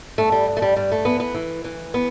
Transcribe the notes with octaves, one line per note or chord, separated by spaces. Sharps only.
G2 A3
G3
G2
A3
G3
G2 G3
A3
E3 B3
B3
E3
E3
B3